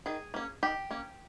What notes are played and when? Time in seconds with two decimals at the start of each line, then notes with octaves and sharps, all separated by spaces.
0.06 D#3 G#4
0.34 A#3 C#4
0.63 D#3 G4
0.91 A#3 C#4